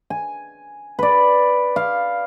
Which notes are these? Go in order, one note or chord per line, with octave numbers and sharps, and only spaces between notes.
G#5
B4 D5
F5